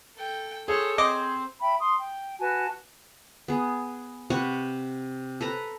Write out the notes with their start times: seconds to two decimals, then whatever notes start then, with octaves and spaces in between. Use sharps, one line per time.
0.15 A4 G5
0.68 G#4 A4 C5 C#5
0.98 C4 C5 D#5 D6
1.61 E5 G5 B5
1.80 C6 D#6
1.99 G5
2.40 F#4 B4 G#5 A5
3.48 B3 G#4
4.30 C3 B4 F#5 C#6
5.41 A4 B4 A#5